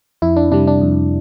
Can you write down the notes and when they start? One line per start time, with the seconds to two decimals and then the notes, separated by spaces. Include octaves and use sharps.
0.22 F2 E4
0.36 D4
0.52 C3 G3 D4
0.67 D4
0.81 F2